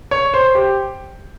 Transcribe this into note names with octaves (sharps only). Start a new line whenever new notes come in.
C#5
C5
G4